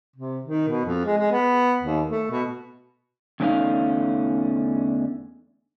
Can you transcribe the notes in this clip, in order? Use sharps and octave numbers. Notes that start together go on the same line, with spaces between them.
C3
D#3
B2
F2
G#3
G#3
B3
D#2
A3
B2
E2 D3 A3 C#4 D#4 F5